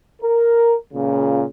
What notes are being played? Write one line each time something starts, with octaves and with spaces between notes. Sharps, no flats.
A#4
C#2 A#2 C#3